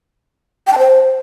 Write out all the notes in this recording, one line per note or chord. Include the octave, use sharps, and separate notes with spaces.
G5
A5
C5